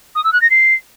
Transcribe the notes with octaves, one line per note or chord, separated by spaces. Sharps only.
D#6
E6
F#6
A#6
C7